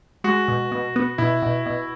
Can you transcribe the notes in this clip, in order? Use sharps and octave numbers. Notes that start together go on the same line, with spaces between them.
G#3 F#4
B2
B2
B3
B2 E4
B2
B2